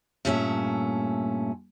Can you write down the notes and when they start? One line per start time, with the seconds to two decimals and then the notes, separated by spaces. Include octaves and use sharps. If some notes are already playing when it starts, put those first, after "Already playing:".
0.25 G2 A#2 A3 C#4 F4 E5